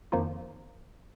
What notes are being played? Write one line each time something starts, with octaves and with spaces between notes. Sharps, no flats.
F2 D#3 F3 A#3 D#4 F4